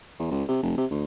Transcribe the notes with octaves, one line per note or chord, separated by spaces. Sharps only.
E2
C#2
C3
F1
C3
D2